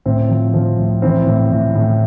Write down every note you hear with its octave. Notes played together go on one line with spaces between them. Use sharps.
A2 C4
F3
F3
A2
E3 C4
A2
A2
A2